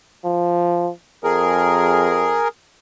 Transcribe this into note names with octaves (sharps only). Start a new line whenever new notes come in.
F3
F2 G#4 A#4